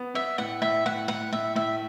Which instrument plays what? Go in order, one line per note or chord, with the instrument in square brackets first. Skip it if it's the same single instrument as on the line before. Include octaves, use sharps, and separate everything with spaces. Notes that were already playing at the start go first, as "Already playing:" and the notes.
Already playing: [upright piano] B3
[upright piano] B3 [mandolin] E5
[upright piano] A2 [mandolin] F#5
[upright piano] A2 [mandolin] E5
[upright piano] A2 [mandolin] F#5
[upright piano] A2 [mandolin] F#5
[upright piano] A2 [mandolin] E5
[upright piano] A2 [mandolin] E5